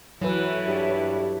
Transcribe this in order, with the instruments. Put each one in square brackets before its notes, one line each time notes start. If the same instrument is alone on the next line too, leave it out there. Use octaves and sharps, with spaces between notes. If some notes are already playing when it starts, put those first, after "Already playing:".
[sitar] E3 [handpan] F#3 B4 [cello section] E4 A4 C#5
[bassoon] G2